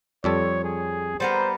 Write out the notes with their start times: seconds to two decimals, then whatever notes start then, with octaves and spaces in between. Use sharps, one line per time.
0.24 F2 G3 A4 C#5
0.64 G#4
1.20 G3 B3 A#4 C5